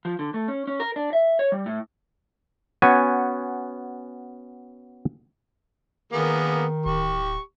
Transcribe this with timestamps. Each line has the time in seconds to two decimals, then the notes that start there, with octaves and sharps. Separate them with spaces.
0.05 F3
0.19 D3
0.34 A3
0.48 C#4
0.67 C#4
0.80 A#4
0.96 D4
1.13 E5
1.39 C#5
1.52 G3
1.66 A2
2.82 B3 C#4 F#4 C#5 G#5
6.13 D#3 A#3 B3 G#4
6.86 D1 G4 C#6